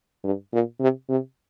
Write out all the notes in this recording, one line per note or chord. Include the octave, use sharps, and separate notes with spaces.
G2
A#2
C3
C3